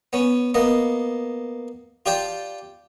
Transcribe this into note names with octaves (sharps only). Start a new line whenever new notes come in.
B3 C#4
A#3 B3 D#5
F4 G4 D5 G5 A5